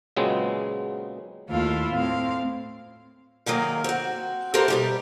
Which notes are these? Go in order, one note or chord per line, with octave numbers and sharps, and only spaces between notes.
A#2 C#3 F#3 G#3 B3 C4
D#2 A3 E4 F4 F5
A2 C4 F5
G#2 D#3 F#3 A#3
C4 F#4
F#4 G4 A4 A#4 C5 E5
B2 G3 G4